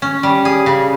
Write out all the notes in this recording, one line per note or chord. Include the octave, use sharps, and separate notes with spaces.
C#4
G3
G#4
C#3